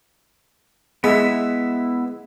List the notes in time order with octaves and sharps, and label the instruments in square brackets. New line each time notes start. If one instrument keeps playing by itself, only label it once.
[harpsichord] G#3 [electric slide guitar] B3 E4 E5